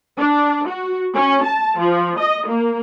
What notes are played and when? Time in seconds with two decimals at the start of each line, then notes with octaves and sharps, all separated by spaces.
0.18 D4
0.67 F#4
1.15 C#4
1.44 A5
1.79 F3
2.18 D#5
2.48 A#3